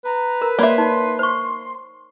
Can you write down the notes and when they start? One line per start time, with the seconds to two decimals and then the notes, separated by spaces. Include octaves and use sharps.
0.05 B4 A#5
0.42 A#4
0.59 A#3 C#5 D5 E5 B5 C6
0.78 D#4
1.19 C5 C#6